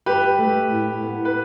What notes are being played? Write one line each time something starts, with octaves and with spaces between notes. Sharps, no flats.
G2 G4 B4
A3
A2
B3
B4